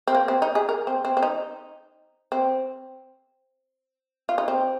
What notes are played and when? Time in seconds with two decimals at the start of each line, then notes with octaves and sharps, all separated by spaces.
0.07 C4
0.15 A#3
0.28 C4
0.42 D#4
0.55 G#4
0.69 A#4
0.87 C4
1.05 C4
1.17 C4
1.23 D#4
2.32 C4
4.29 F4
4.38 D#4
4.48 C4